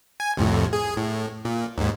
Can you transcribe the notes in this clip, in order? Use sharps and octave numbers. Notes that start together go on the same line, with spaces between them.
G#5
C2 F2 A2
G#4
A2
A#2
D#2 G#2